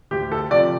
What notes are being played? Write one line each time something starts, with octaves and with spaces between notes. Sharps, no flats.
D2 G4
A4
C3 F3 D5